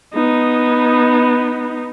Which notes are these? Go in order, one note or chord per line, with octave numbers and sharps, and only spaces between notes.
B3 D#4